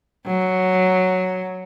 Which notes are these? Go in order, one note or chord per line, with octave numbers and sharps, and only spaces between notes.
F#3